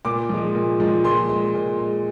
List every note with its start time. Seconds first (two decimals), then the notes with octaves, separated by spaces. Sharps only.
0.05 A#2 D6
0.29 F3 G#3
0.55 A#2
0.80 F3 G#3
1.04 A#2 C6
1.29 G#3
1.55 A#2
1.79 G#3